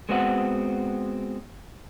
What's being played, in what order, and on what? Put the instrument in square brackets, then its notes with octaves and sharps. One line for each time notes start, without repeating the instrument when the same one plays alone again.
[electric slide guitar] G#3 B3 C4 F#4 B4 F#5